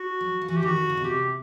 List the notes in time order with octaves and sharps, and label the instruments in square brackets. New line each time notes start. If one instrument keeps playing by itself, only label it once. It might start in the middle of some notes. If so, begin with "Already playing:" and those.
Already playing: [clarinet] F#4
[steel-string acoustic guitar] F#3
F3
[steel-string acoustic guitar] E3 [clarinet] F#4
[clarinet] G4
[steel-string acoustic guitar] D#3 [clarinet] F#4
[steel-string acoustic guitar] D3
C#3
B2
[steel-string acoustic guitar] C3 [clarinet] G4